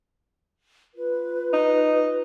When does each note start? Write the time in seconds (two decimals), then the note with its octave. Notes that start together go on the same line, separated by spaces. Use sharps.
0.95 F4 B4
1.53 D#4